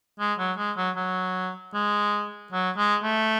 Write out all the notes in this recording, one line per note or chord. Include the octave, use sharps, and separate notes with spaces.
G#3
F#3
G#3
F#3
F#3
G#3
F#3
G#3
A3